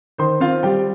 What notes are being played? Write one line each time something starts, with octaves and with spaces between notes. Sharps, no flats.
D#3 C5 C6
C4 F4 F5
G3 G4 G5